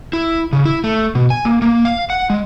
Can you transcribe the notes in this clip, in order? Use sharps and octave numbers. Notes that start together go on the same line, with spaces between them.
E4
C#3
E4
A3
B2
G#5
A#3
A#3
F5
F#5
G#3